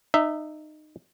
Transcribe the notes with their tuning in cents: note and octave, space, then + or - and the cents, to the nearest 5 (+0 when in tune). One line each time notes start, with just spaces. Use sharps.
D#4 -25 E5 +0